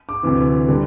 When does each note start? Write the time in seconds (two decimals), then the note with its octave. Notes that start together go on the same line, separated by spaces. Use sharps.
0.09 D6
0.23 D2 C3 E3
0.68 D3 G3